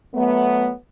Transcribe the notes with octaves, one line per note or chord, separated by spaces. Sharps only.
F#3 A3 B3